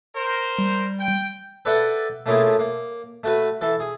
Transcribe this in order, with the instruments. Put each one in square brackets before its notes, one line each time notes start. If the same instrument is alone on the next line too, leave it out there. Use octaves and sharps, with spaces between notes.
[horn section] A#4 C5
[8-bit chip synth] G3
[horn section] G5
[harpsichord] A4 B4 D5 E5 F#5 G5
A3 A#3 C#4 E4 F4 G#4
A#3
A3 F#4 B4
E3 A4
G#4